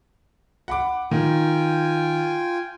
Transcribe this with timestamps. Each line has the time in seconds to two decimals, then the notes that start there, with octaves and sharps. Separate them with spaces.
0.68 F#5 B5 D6
1.11 D#3 F4 G5 G#5